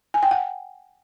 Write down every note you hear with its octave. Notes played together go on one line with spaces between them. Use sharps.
G#5
G5
F#5